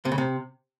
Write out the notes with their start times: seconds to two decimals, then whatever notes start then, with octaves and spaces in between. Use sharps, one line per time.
0.05 C3
0.12 C#3
0.18 C3